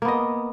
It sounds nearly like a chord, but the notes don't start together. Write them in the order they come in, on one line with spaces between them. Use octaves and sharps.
A#3 B3 D#5